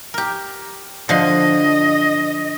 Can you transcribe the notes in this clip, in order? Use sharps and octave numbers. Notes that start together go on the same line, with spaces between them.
G4 A#4
D3 F3 D#5